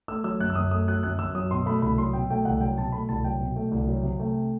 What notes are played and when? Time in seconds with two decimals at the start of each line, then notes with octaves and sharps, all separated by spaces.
0.08 A3 E6
0.24 F#3 E6
0.40 F#2 F#6
0.50 E6
0.55 F#2 D#6
0.71 A3 D#6
0.88 F#3 F#6
1.03 F#2 F#6
1.19 F#2 E6
1.35 F#3 D#6
1.51 B2 C6
1.66 A3 B5
1.82 C2 B5
1.98 F#3 C6
2.13 B2 G5
2.30 A3 G5
2.45 C2 F#5
2.61 F#3 G5
2.77 B2 A5
2.92 A3 B5
3.09 C2 A5
3.24 F#3 G5
3.40 B2
3.56 A3
3.71 C2
3.87 F#3
4.03 C3
4.19 A3